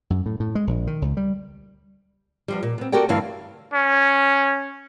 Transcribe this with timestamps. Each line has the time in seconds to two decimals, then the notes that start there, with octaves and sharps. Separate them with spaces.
0.10 F#2
0.26 A2
0.40 A2
0.55 G#3
0.67 A#1
0.87 D#3
1.02 C#2
1.17 G3
2.48 E2 F3 G3
2.63 A#2
2.78 B3 C4
2.92 F#4 G4 A4 A#4 D5 G5
3.09 D2 G2 E3 E4 F5
3.73 C#4